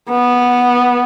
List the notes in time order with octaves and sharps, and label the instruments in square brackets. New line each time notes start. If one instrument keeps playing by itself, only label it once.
[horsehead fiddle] B3